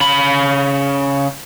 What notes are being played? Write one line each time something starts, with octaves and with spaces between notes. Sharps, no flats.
C#3 B5